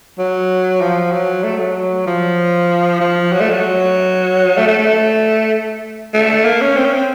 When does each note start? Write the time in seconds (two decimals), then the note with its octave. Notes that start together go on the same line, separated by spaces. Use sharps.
0.18 F#3
0.81 F3
1.12 F#3
1.44 A3
1.59 F#3
2.07 F3
3.01 F3
3.32 F#3
3.41 A3
3.50 F#3
4.57 A3
4.68 A3
4.78 A3
6.14 A3
6.45 A#3
6.61 C#4
6.77 C4
6.85 C#4
6.94 C4